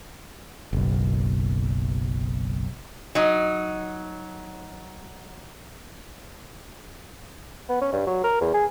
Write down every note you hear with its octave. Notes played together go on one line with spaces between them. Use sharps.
F#1 B1
F#3 D#4
B3
C#4
G2
F#3
A#4
E2
G#4